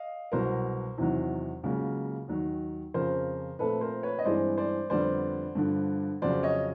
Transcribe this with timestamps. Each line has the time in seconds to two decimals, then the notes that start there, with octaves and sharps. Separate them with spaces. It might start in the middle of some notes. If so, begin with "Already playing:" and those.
Already playing: D#5 F5
0.32 C2 B2 F#3 A#4 C5
0.98 E2 C3 D#3 F#3
1.63 C#2 C#3 F#3 A#3
2.28 D#2 D#3 F#3
2.94 F2 C#3 F3 A#4 C5
3.59 A#2 F3 A3 C4 A4 B4
3.81 A#4 C5
4.03 B4 C#5
4.19 D#5
4.24 G2 E3 G#3 C4 C5 D5
4.58 C5 D5
4.90 F2 D3 G3 B3 C5 D5
5.55 G2 D3 F3
6.22 F2 C#3 F#3 C5 D5
6.43 C#5 D#5